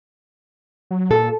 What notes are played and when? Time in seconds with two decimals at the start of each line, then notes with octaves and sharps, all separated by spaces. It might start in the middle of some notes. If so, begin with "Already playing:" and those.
0.91 F#3
1.11 A#2 A4